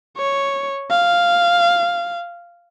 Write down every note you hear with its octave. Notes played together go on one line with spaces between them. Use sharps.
C#5
F5